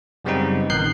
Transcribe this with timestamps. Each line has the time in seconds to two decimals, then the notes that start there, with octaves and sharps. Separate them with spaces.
0.25 F#2 C#3 G3 B3 C4 D#4
0.70 A1 D#3 F#6 G6 C7